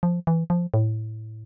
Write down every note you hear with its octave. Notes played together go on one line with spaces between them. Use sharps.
F3
E3
F3
A2